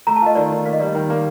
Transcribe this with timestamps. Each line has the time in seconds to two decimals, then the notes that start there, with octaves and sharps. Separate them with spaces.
0.07 A3 A#5
0.16 A5
0.21 F4 D#5
0.35 D#3 D5
0.51 D#3
0.65 A#3 F5
0.73 D#5
0.79 G3 D5
0.87 D#5
0.94 D#3 G5
1.10 A#3